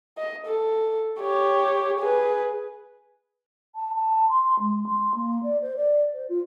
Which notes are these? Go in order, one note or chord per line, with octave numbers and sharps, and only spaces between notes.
D#5
A4
G4 C#5
G#4 B4
A5
A5
C6
G#3
C6
A#3
D5
C5
D5
C5
F4